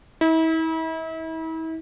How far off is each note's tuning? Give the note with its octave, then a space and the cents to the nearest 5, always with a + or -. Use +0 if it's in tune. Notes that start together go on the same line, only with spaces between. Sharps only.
E4 -40